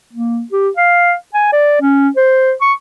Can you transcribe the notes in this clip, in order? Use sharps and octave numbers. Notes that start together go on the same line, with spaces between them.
A#3
G4
F5
G#5
D5
C#4
C5
C#6